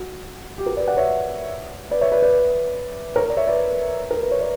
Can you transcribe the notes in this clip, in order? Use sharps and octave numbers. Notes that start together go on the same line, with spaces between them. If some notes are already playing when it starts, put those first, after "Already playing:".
Already playing: F#4
G4
F#4 A#4
B4 D5
D5 F#5
C#5 E5
B4 D5
C#5 E5
B4 D5
B4 D5
A#4 C#5
D5
C#5 E5
B4 D5
A#4
B4
C#5
B4 D5